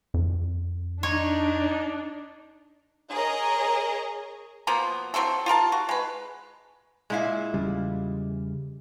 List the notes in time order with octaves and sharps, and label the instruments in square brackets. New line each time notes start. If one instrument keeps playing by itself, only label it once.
[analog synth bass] F2
[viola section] D4 [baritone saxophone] D#4 [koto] C#5
[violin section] G#4 A#4 C#5 D#5 A#5
[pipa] B2 F3 A#3 B3
F#3 C4 E4 A4
F4 G4 A#4 A5
F#4
G#3 B4
[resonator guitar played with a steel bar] A#2 E4 F5 [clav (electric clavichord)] G#3
[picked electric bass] E2 C#3 G3